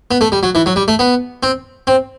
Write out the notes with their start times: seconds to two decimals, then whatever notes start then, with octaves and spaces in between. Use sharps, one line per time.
0.11 B3
0.21 A3
0.32 G3
0.43 F#3
0.55 E3
0.66 F#3
0.76 G3
0.88 A3
0.99 B3
1.43 C4
1.87 C4